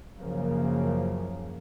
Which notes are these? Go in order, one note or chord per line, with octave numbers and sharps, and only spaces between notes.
F#2 C#3 F3 A#3